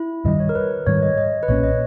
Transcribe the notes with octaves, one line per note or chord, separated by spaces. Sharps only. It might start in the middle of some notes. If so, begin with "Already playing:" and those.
Already playing: E4
G2 D#3 G3 D#5
C#5
A#4
B4
B4
G#2 D#3 G3 C#5
D#5
D#5
B4
B1 A#2 A#3 C#4 C#5
D#5